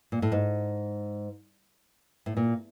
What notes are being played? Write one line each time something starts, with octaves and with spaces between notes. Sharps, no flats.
A#2
A2
G#2
A2
A#2